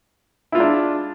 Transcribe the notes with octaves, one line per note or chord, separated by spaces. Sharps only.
G#3 D4 E4 F4